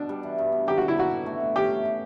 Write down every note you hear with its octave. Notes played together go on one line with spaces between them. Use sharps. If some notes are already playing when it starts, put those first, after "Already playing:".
Already playing: B2 D4
G3
E3
G2
B3
F#3 G4
D3 F#4
E4
F#3 F#4
B2
A3
B2
C#4 G4
E3
E3